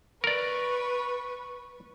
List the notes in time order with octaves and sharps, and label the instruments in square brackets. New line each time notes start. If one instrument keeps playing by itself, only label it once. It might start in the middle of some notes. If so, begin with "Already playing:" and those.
[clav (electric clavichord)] A#4 D5 [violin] B4 C#6